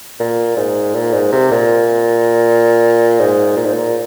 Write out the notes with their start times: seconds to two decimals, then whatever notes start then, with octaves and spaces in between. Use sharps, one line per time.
0.20 A#2
0.57 G#2
0.95 A#2
1.13 G#2
1.32 C3
1.51 A#2
3.20 G#2
3.57 A#2
3.65 G#2
3.73 A#2